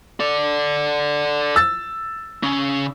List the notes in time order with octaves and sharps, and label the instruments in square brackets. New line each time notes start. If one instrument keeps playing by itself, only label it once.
[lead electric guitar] A4 D5
[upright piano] E6 A6
[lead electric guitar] C#3 C#4